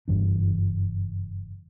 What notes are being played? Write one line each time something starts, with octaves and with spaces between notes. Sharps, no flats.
F#1 G2 E3 D4